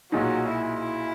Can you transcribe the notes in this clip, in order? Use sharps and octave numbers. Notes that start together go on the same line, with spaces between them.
B1 A#2 F#3 G#3 D#4
E4
E4